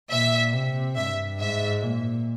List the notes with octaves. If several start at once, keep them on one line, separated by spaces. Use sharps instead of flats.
A#2 E5
C3
G2 E5
G#2 E5
A#2